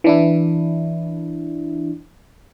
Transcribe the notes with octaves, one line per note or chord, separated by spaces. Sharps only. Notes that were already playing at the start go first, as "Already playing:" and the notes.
E3 D4 E4